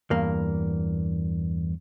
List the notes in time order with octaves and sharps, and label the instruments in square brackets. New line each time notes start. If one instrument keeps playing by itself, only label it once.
[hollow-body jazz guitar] E2 G2 A#3